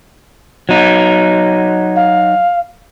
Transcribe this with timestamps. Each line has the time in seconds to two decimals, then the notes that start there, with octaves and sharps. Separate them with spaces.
0.69 F#3 D#4
1.96 F5